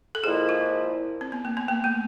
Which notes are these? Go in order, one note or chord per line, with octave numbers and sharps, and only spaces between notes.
A4
A#2 F3 G#3 C4 E4 G#4
F4
C4
B3
A#3
B3
A#3
A3